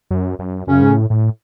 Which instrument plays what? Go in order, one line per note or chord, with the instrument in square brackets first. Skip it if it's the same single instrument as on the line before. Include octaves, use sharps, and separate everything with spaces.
[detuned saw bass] F#2
F#2
[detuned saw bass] F#2 [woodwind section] C#3 C#4
[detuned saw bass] G#2
A2
A2